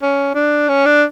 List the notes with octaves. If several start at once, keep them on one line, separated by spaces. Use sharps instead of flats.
C#4
D4
C#4
D4